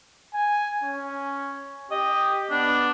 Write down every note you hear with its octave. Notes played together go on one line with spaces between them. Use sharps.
G#5
C#4
G4 D#5
B3 D4